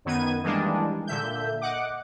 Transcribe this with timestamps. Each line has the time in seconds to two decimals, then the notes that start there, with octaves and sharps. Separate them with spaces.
0.05 F#2 D#3 B3 G#6 D#7
0.43 D#3 E3 G3 G#3 A#3 D4
1.07 A#2 D3 E5 G6
1.61 D#5 F#5 D6